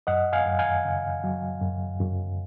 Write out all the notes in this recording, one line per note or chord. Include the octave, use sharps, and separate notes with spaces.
F#2 D#5 F#5
F5 G#5
F#2
F5 G#5
C#3
F#3
F#2
F#2